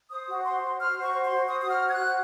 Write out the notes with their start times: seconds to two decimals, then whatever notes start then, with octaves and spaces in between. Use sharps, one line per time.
0.10 C5 D#6
0.27 F#4
0.44 C5 C6
0.62 F#4
0.79 C5 F6
0.96 F#4
1.02 C#6
1.13 C5
1.24 C6
1.30 F#4
1.47 C5 D#6
1.61 F#4 D#6
1.71 F6
1.82 C5
1.89 G#6
1.93 F#6
1.99 F#4